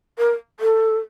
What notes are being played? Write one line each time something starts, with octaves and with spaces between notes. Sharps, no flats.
A#4
A4